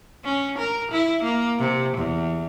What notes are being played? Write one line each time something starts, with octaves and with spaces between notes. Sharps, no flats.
C#4
A#4
E4
A#3
C3
E2